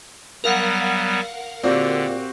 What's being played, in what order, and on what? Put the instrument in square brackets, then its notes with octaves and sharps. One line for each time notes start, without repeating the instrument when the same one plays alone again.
[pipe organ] F#3 G3 B3 [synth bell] A#4 F5 F#5
[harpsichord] A#2 [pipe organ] D3 [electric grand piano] C4 F#4 G4